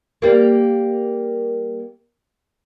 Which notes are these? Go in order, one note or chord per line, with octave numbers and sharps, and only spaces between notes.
G3 A#3